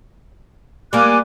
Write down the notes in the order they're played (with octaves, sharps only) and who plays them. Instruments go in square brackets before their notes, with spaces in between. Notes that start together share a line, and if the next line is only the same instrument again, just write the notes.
[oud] G3 A#3 [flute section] G#5 D6 F#6